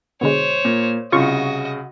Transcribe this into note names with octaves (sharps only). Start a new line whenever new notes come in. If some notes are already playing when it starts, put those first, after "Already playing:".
B2 D3 G#3 C5 C#5
A#2
C2 C#3 F4 F#4 D#5 C#6